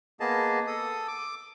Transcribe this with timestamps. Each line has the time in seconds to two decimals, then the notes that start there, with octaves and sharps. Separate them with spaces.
0.20 A#3 B3 G#4 D#5 A5
0.67 A4 D#6
1.08 D6